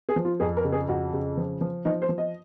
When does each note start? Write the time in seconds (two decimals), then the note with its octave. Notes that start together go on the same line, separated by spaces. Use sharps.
0.09 G#4
0.16 F3
0.25 F4
0.40 F2 G#4
0.57 A#4
0.64 C#3
0.72 G#4
0.88 F2 F#4
1.13 C#3
1.37 F3
1.61 F3
1.85 F3 D#4
2.02 C5
2.09 F3
2.18 D#5